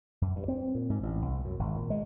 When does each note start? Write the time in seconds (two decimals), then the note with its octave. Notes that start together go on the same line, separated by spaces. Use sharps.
0.22 F#2
0.36 G2
0.48 C4
0.75 A#2
0.90 G#2
1.03 A1
1.22 C2
1.45 F#2
1.59 G#1
1.76 A#2
1.90 G#3